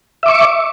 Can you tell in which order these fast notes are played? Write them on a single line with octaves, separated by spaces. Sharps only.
E5 D6 C#6